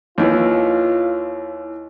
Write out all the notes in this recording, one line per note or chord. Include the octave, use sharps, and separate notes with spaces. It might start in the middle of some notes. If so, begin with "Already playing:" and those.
D#2 E3 E4 F4 C#5